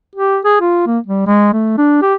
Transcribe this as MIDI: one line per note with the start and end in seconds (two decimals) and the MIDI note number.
0.16 0.38 67
0.44 0.56 68
0.61 0.82 65
0.87 0.99 58
1.06 1.25 55
1.27 1.50 56
1.53 1.75 57
1.77 1.99 62
2.02 2.14 67